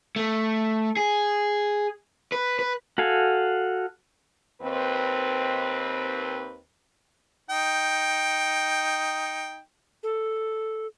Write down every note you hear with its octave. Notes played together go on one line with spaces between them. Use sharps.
A3
G#4
B4
B4
F#4 A4 F5 G#5
D#2 C4 B4
D#4 G5
A4